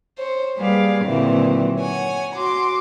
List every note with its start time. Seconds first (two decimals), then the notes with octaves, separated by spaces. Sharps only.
0.18 C5 C#5
0.57 G3 A#3 G#4 B4 D5 F5
1.05 D#2 A#2 D3 E3 F#3 C4
1.78 C#5 F#5 G#5
2.36 F#4 C6 D6